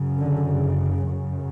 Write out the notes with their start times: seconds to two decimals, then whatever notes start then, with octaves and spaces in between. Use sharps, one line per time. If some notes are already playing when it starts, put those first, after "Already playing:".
Already playing: F#2 C#3
0.18 D3
0.46 C#3
1.04 F#2 C#3